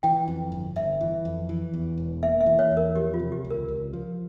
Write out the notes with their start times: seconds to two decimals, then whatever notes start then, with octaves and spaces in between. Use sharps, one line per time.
0.03 E3 G5
0.28 F2
0.52 G1
0.76 G1 E5
1.01 E3
1.25 F2
1.49 E3
1.73 E2
1.98 E1
2.23 A#3 E5
2.41 E5
2.46 E3
2.59 C#5
2.71 E2
2.77 A#4
2.95 F3 G4
3.14 F4
3.19 C3
3.32 G4
3.44 C#2
3.50 A#4
3.68 C#2
3.93 F3